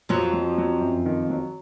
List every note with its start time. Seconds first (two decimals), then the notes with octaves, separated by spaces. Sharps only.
0.09 F2 F3 F#3
0.34 F#3
0.58 F#3
0.81 F#2
1.06 D#3
1.30 F#3